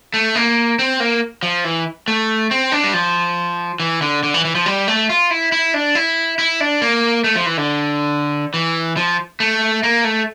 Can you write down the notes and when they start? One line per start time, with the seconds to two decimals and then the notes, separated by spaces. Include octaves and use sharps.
0.14 A3
0.36 A#3
0.79 C4
1.00 A#3
1.43 F3
1.64 E3
2.08 A3
2.51 C4
2.72 D4
2.84 G3
2.94 F3
3.80 E3
4.02 D3
4.23 D3
4.34 E3
4.45 E3
4.55 F3
4.66 G3
4.88 A3
5.09 F4
5.31 E4
5.52 E4
5.74 D4
5.95 E4
6.39 E4
6.60 D4
6.82 A#3
7.24 A3
7.36 F3
7.46 E3
7.57 D3
8.54 E3
8.97 F3
9.40 A3
9.83 A#3
10.04 A3